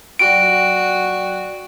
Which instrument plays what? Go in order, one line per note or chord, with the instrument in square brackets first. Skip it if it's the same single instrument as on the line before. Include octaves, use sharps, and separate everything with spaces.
[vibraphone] F#3 D5 G5 [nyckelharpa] F#4 [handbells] D7